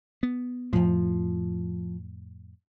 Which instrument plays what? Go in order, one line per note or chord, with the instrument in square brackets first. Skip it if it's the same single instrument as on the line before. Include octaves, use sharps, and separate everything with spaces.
[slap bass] B3
[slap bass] F2 A2 [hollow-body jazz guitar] F3